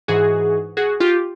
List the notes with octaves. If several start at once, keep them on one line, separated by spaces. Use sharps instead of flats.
G#2 E3 F#4 G#4
F#4 G#4
F4 G4